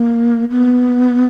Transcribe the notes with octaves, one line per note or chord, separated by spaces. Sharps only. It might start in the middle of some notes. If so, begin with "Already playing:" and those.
Already playing: A#3
B3